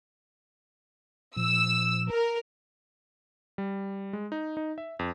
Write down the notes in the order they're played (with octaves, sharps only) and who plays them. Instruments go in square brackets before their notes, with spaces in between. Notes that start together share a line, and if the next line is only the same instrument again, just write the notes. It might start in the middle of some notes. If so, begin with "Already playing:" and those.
[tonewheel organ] A#2 F3 [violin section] E6
[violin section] A#4
[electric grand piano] G3
G#3
D#4
D#4
E5
F2